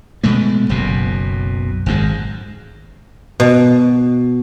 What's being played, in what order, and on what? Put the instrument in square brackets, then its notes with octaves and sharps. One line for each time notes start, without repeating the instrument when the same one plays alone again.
[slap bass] B2 G#3 A3
F#1 B1 F#2 B2
G#1 F#2 G#3
[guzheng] B2